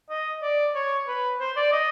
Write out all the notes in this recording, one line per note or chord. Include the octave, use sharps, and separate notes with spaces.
D#5
D5
C#5
B4
C5
D5
D#5